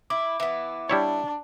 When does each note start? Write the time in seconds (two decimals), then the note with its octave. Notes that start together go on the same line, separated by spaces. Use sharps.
0.10 E4 D6
0.40 E3 B3
0.89 G3 D4 E4 C#5